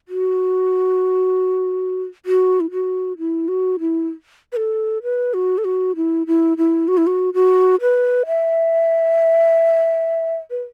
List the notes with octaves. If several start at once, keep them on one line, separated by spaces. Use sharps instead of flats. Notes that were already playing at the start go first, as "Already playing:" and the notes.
F#4
F#4
E4
F#4
E4
F#4
E4
B4
A4
B4
F#4
A4
F#4
E4
E4
E4
F#4
E4
F#4
F#4
B4
E5
B4